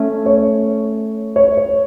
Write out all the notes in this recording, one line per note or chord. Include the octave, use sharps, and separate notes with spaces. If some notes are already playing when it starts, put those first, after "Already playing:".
Already playing: A3 C#4
C#5
C#5
C#5